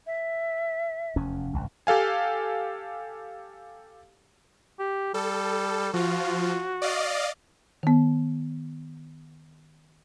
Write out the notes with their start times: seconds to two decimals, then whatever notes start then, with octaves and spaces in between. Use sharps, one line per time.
0.06 E5
1.16 F1 E2 C#4
1.53 G#1 C#2 G2
1.87 G4 A4 F5 G#5
4.79 G4
5.14 G3 A4
5.94 F3 F4 F#4
6.82 D5 D#5 F5
7.83 D#3 B3